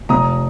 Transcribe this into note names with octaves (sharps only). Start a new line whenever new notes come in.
F1 A#5 D#6